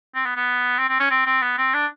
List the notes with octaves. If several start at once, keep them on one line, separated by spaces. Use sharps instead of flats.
C4
B3
B3
C4
C4
C#4
C4
C4
B3
C4
D4